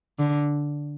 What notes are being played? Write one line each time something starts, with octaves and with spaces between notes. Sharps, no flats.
D3